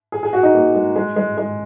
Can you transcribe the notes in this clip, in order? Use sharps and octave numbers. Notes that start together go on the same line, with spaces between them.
G#4
G#4
F#4
D#4
A#3
G#3
G#3
G#3
G#3